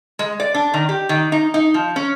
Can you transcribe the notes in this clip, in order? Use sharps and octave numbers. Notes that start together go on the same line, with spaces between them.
G#3
D5
D4
D#3
G4
D#3
D#4
D#4
F3
C#4